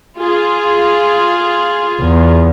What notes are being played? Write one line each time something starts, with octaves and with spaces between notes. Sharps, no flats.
F4 G#4
E2